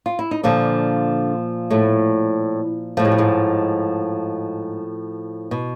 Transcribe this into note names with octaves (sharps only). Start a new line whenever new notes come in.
F4
E4
D#4
A#2 D3 F3 D4
A2 A3
A2 F3 A3
G#3
G3
G#2 G#3
B2